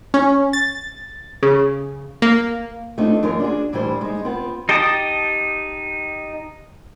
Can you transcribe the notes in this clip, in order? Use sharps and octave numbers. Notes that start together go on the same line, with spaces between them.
C#4
A6
C#3
A#3
A3 C4 D4 D#4 F4
F#2 E3 G#3 F4 A#4 C#5
D4 F#4 G#4
A2 E3 G3 D4 E4 C5
G#3 D#4
B3 C4 F4
D#4 G4 G5 A5 D#6